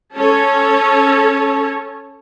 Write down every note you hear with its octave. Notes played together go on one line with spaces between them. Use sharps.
C#4 A4 C#5